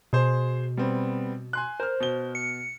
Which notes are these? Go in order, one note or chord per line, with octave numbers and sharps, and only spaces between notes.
B2 G#4 C5
G3 B3 C4
G#5 C6 F#6
A#4 C5 F6
B2 G7
C#7